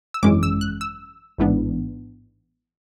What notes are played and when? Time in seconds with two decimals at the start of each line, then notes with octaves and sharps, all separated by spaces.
0.14 E6
0.23 G#1 F#2 E3 G#3 C#4 D6
0.43 E6
0.61 F#6
0.81 E6
1.38 A1 G#2 E3 B3 D4